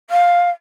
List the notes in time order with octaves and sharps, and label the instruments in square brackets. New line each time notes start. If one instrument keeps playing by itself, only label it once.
[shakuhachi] F5